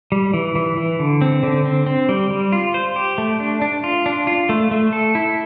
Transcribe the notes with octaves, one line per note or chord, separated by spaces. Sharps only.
G3
E3
E3
E3
D3
C4
D3
C4
C4
G3
G3
F4
C5
G4
A3
D4
D4
F4
D4
F4
A3
A3
A4
E4